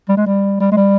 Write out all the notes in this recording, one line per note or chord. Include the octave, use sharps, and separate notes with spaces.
G3
G#3
G3
G3
G#3
G3